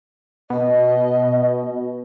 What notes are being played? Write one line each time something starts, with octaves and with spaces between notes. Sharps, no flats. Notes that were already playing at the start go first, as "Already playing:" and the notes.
B2 D#5